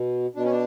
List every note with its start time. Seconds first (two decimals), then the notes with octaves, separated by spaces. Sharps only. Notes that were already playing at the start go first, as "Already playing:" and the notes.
Already playing: B2
0.35 B2 D4
0.44 C#4
0.51 D4